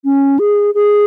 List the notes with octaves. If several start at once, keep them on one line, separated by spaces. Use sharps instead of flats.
C#4
G#4
G#4